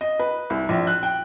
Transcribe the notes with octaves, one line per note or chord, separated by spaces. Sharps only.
D#5
B4
C2
A#1
F#6
G5